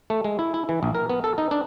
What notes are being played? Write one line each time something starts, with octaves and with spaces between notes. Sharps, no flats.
A3
G#3
E4
E4
E3
A#1
A#4
B3
A4
D#4
D4